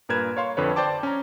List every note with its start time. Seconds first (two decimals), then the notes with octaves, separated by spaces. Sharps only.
0.09 G2 A#2 A#4 B4 G#6 E7
0.37 C#5 F5 C6
0.57 F2 D3 B4 C#5
0.76 C5 D5 G5 A5 D6
1.03 C#4 G#5 A#5